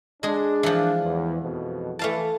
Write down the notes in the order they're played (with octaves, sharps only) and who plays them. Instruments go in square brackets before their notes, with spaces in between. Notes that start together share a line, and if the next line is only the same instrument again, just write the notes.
[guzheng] G#3 G#4 [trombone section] D4
[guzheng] E3 F3
[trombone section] E2
F2 B2
[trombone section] E3 [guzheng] A3 F5 A5